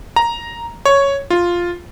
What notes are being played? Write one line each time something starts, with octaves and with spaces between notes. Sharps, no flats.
A#5
C#5
F4